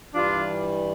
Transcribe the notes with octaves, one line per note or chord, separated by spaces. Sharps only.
G2 E3 G3 D4 F4